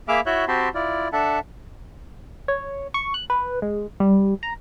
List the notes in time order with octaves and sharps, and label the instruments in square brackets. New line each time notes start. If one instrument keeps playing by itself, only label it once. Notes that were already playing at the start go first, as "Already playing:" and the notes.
[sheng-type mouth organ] A#3 G#4 E5 B5 D6 F6
E4 F#4 C#5 E5 F#6 G6
C4 F#4 G4 A5 B5 C6
E4 F4 D5
D4 A4 E5 F#5 A5
[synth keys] C#5
C#6
F#6
B4
G#3
G3
A#5